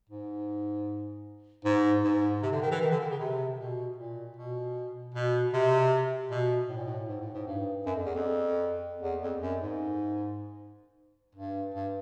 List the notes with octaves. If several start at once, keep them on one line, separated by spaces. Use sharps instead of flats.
G#2
G#2
G#2
C3
D3
D#3
E3
D#3
D3
D#3
C#3
C3
B2
A#2
B2
B2
C3
B2
A2
A#2
A2
G#2
A2
G#2
G2
F#2
F2
E2
F2
E2
F2
F#2
G#2
G2
G2